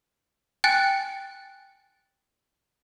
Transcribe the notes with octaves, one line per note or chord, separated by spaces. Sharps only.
G5 G#5 F#6 A6 C#7